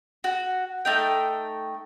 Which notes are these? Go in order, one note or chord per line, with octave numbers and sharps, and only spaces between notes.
F#4
A3 D#4 G5